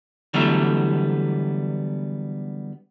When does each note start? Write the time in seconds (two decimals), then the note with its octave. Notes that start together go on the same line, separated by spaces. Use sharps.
0.34 D3 E3 F#3 G3 A3 B3